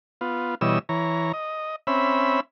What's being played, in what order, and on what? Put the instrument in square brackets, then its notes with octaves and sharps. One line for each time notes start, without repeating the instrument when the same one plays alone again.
[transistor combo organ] B3 F4
B2 E3 G3 C#5 D#5 E6
E3 C#5 A#5
D#5
C4 C#4 E5 B5